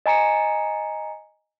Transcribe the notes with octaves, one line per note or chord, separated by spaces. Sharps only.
D#5 G#5 A#5 C#7